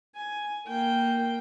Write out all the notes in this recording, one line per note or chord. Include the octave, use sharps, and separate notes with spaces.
G#5
A#3 G5